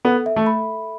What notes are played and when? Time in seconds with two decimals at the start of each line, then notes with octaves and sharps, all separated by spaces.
0.05 B3 A4
0.26 E5
0.36 A3
0.46 B5